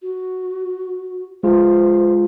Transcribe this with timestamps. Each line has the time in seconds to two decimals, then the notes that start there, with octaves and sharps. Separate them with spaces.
0.03 F#4
1.43 G#3 F4 G#4 C5